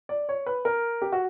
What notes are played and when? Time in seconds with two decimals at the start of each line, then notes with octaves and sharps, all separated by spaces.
0.09 D5
0.29 C#5
0.46 B4
0.65 A#4
1.02 G4
1.12 F#4